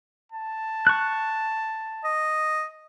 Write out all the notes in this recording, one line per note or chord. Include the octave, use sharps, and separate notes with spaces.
A5
C#6 F#6
D#5